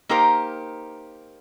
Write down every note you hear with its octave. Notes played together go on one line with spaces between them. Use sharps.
A#3 D#4 G4 A#4 C5